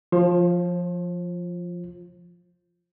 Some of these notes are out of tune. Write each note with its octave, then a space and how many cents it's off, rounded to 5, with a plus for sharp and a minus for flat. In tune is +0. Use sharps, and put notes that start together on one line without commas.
F3 +0 F4 +0 C5 +40